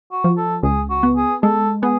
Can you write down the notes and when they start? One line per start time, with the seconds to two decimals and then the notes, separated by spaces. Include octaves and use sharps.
0.11 F#4
0.24 F3
0.37 A4
0.63 C#2 G#4
0.90 F#4
1.03 B3
1.16 G#4
1.43 G#3 A4
1.83 B3 G#4